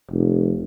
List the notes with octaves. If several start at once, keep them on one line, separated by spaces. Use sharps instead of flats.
F1